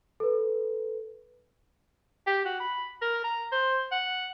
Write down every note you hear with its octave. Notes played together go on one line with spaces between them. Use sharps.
A4 B4
G4
F#4
B5
A#4
A#5
C5
F#5